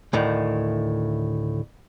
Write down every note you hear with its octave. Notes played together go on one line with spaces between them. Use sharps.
D2 A2 D#3